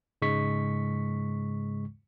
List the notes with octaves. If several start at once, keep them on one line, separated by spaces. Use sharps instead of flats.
G#2 C#3 G#3 C#6 B6